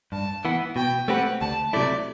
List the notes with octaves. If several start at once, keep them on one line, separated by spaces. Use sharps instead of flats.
G2 A5
E3 B3
B2 G5
A3 C4 G4 B4 F#5
D2 A5
C3 F#3 A3 E4 D5